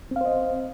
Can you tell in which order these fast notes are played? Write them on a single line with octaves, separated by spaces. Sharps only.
C4 F5 C5 D#5